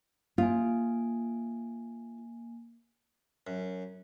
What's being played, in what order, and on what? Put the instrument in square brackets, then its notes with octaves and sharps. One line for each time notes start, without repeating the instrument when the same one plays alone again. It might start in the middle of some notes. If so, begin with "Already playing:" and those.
[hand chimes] A#3 G#5 [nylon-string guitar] F4
[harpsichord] F#2